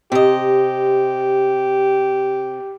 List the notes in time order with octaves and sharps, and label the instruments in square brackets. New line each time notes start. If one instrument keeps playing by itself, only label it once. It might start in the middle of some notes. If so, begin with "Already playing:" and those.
[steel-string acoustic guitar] C3 D#5 [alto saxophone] G4